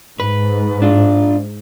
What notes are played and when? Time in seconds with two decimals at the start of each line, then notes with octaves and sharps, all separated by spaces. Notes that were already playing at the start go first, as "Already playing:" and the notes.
0.20 G#2 B4
0.82 D4 F4